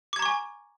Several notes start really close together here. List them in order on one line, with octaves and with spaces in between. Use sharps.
D6 G#6 A#5 C#6 G#5